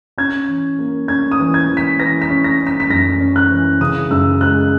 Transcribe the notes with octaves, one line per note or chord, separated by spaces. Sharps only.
C#4 G#6
E3
A#3
C#4 G#6
D#6
E3
G#6
E3
B6
E3 A#6
B6
C#4
A#6
C#4
B6
B6
F#2 A#6
C#4
F#6
E3
C#3 D#6
F#2 E6
G#3 F#6